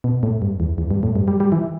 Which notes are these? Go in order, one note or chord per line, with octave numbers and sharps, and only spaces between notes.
B2
A2
G2
E2
E2
G2
A2
G2
G3
G3
E3